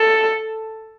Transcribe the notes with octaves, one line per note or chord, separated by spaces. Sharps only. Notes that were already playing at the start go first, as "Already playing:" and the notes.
Already playing: A4